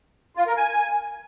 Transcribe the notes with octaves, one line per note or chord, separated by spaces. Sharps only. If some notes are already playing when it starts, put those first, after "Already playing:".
F4
A#4
G#5